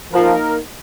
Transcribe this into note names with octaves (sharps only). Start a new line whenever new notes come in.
F3 A#3 D#4 A#4